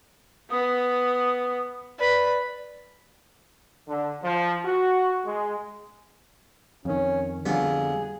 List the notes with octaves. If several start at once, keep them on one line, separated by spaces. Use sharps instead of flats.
B3 D#6
B4 D5 B5
D3
F3
F#4
G#3
F2 D#3 C#4
F2 D3 G3 B3 G#4